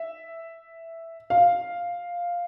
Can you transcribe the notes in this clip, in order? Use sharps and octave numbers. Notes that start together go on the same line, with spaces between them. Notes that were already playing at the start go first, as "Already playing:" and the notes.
Already playing: E5
F5